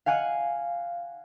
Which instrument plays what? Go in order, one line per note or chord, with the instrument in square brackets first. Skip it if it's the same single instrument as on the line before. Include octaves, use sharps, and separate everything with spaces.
[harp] F5 F#5 G#5 F#6 C#7 D#7